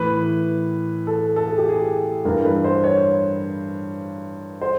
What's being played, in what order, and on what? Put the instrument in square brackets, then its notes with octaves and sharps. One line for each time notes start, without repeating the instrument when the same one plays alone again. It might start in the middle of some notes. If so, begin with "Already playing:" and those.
Already playing: [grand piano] A2 E3 B4
A4
A4
G#4
G4
G#4
G2 E3 A#4
B4
C5
C#5
C5